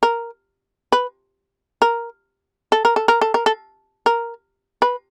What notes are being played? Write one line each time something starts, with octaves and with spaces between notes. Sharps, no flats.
A#4
B4
A#4
A4
A#4
A4
A#4
A4
A#4
A4
A#4
B4